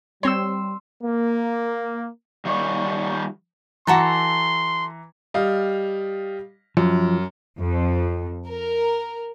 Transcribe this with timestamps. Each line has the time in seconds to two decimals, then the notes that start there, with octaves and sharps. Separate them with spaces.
0.23 G3 C4 C#5 C6 E6
1.04 A#3
2.45 D#3 G3 C#5 D5
3.87 E3 F#4 A4 A5 A#5 C6
5.34 G3 D#5 F5
6.77 F#2 F3
7.59 F2
8.49 A#4